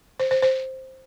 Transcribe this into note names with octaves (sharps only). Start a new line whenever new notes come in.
C5
C5
C5